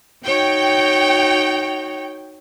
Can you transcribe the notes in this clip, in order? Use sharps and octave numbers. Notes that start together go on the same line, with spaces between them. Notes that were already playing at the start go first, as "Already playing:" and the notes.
D#4 F#4 C#5 G5